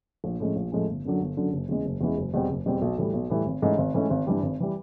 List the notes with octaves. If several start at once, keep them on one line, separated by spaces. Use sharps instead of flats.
A#1
A2 F3 G#3 C#4
A#1
A2 F3 G#3 C#4
G1
F#2 D3 F#3
G1
F#2 D3 F#3
F#1
E2 C#3 E3 G#3
F#1
E2 C#3 E3 G#3
F#1
E2 B2 G3 C4
F#1
E2 B2 G3 C4
B1
A2 E3 G3
B1
A2 E3 G3
G#1
G#2 E3 A3 C#4
G#1
G#2 E3 A3 C#4
G#1
G2 E3 G3
G#1
E3 G3